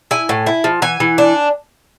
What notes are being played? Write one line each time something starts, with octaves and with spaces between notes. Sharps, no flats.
E4 G#5
A2
E4
F3
E3 G#5
E3
D4